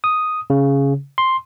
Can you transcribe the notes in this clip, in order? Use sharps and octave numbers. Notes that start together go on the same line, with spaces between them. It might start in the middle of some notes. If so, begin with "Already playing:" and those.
D#6
C#3
C6